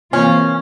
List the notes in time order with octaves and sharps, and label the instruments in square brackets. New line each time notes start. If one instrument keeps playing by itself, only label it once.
[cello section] C3 E3 A#3 F4 C5 [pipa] C#4